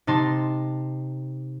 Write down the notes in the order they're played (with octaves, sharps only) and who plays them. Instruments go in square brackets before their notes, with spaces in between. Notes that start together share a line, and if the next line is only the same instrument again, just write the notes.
[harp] C3 D#4 A5 C6